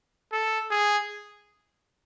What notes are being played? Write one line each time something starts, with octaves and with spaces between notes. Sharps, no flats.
A4
G#4